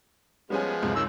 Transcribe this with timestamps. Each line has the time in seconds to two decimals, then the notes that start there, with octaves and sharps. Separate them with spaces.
0.50 F3 G3 G#3 B3 C#4 G#5
0.83 C#2 F#2 C3
0.96 D#3 C#5 E6